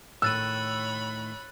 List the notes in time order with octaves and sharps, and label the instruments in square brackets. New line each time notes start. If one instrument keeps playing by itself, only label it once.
[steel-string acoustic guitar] A2 D#3 [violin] C#5 B5 [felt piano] E6 [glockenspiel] F#6 A6 D#7